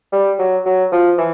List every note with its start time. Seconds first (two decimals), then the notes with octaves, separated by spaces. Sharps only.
0.12 G3
0.39 F#3
0.66 F#3
0.92 F3
1.18 E3